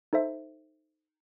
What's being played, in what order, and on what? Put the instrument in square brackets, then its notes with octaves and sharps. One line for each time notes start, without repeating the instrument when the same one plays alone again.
[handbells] D#4 A4 C5 E5